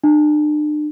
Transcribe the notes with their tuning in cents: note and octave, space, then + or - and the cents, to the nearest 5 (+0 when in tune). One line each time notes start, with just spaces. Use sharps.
D4 +40